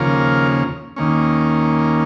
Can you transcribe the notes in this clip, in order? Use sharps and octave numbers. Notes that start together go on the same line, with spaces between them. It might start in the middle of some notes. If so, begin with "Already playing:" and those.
Already playing: D#2 C#3 F3 A#3 C#4 F4 A#4
D#2 D#3 A#3 C#4